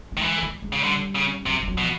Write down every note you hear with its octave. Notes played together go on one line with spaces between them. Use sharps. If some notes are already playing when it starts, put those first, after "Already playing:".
A3
D#3
E3 G#3
A3
G#3
G#3
C#3
D3 G3
C#3
C3 F#3
G3
F#3
B2
F3